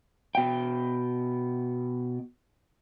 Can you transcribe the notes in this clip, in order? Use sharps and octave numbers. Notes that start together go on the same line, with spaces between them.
B2 G5